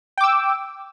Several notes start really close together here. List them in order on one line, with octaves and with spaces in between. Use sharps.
G5 D6 E6